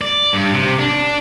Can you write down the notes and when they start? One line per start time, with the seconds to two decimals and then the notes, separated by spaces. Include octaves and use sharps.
0.01 D5
0.33 G2
0.54 C3
0.79 D4